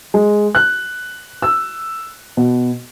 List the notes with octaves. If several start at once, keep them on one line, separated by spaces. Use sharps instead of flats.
G#3
F#6
E6
B2